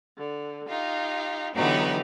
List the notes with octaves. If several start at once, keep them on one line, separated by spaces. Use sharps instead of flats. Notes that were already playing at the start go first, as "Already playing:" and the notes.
D3
D#4 F4 G4
D3 E3 F#3 B3 D#4 G4